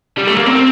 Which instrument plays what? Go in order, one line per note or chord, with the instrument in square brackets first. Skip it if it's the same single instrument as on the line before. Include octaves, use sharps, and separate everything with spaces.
[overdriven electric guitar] G3
A3
A#3
C4